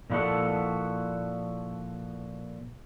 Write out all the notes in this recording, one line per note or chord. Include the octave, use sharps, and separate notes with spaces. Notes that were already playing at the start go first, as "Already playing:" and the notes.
A#2 F3 E4 F#4 A4 F#5